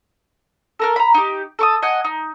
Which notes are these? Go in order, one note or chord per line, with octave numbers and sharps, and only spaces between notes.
A4 A#4 F6
A#5 B5
D#4 G4
A4 C#6 D#6
D#5 F#5 G#5
D#4